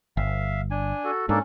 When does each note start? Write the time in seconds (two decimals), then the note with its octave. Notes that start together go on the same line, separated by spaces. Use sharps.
0.17 G1 E5 F5
0.71 D4 G#5
1.04 F#4 A4
1.29 G#2 A#3 C#4 D4 A4